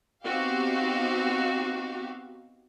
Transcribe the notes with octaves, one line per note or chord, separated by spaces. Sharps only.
B3 C4 D#4 F#4 G4 F5